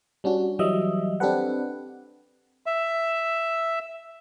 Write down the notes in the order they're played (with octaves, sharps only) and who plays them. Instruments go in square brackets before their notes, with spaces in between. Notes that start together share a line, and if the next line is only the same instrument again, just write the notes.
[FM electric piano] G3 C#4 D4 F#4
E3 F#3 G3 D#5 E5
C4 D4 G4 A4 B4 F#5
[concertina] E5